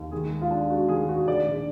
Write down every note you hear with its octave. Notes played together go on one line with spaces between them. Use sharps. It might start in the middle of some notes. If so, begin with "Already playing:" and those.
Already playing: D#2
D#3 G#4
G#3
F4
D4
G#3 F#4
D#3 G#4
D4 F#4
D#3 D5
A#1